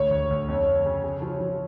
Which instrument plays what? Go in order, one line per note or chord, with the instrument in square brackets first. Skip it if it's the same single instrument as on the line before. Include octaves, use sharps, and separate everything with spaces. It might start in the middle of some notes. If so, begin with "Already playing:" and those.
Already playing: [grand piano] D2 [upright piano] C#5
[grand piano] D2
D2
F2
F2
C#3
C#3
F3
F3